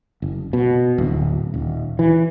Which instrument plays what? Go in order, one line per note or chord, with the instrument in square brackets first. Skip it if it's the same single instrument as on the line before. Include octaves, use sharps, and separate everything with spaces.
[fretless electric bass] F#1
B2
D1
D#1
E3